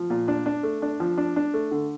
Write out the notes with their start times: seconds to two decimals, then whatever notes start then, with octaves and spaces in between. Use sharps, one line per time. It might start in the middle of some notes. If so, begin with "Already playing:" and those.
Already playing: F3
0.10 A#2
0.28 D4
0.46 D4
0.63 A3
0.82 D4
1.00 F3
1.18 D4
1.36 D4
1.54 A3
1.71 D3